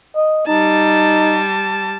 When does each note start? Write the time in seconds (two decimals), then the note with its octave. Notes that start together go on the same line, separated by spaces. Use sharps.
0.16 D#5
0.47 G3 D#4 A5